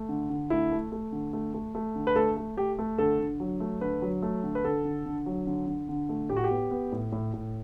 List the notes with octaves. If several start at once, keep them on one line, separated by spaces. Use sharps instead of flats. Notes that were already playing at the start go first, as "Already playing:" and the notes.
Already playing: A3
D3
D3
A3 E4
A3
A3
D3
A3
A3
A3
D3
B4
A3 A4
A3
A3 G4
A3
D3 A4
D3
F#3
A3
D3 B4
F#3
A3
D3
B4
D3 A4
D3
D3
F#3
D3
D3
D3
A3
A2 G4
F#4
G4
B3
B3
A2
A2
A2